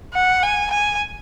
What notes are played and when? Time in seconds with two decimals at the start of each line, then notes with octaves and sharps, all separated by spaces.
0.14 F#5
0.43 G#5
0.71 G#5